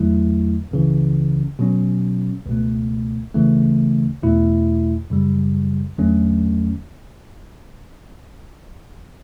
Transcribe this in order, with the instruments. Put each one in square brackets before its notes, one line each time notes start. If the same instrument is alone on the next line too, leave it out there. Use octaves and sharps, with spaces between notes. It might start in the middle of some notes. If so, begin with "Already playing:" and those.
Already playing: [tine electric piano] E2 D3 F#3 A3 E4
C#2 C#3 E3
B2 F#3 C#4
C#2 B2 A3
D2 C#3 E3 A3
E2 B2 A3 E4
F#2 C#3 G3
E2 D3 F#3 A3 C#4